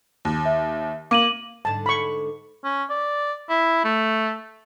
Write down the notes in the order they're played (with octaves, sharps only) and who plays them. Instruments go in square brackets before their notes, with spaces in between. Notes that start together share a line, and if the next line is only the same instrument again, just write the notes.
[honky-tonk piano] D#2
[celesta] E5
[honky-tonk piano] A#3 [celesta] D6 D#7 F#7
[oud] G#2 D3 [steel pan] A5
[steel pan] B5 C#6
[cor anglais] C#4
D5
E4
A3